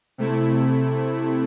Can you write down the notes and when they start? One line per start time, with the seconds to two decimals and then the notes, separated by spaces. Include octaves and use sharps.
0.18 C3 A3 E4